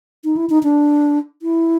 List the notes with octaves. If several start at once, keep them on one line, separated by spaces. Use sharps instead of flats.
D#4
E4
D#4
D4
E4